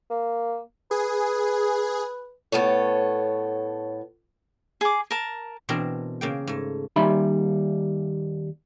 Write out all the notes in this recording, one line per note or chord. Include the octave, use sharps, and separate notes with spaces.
A#3
G#4 B4
A2 B3 A4 C#5
G#4 D6
A#4 A5
B2 E3 C4 D4 A#4
C#3 A#3 G5
G#2 A3
D#2 G3 D#4 E5 B5 C6